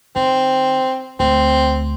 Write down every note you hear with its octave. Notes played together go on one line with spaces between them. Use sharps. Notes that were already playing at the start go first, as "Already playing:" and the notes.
D#3 C4
D2 C4